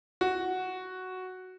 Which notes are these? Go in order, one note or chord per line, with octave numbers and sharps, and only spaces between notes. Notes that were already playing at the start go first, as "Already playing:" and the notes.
F#4